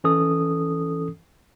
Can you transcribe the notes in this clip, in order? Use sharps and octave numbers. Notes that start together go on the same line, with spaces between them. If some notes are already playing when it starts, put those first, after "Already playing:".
E3 C#4 A4 D#6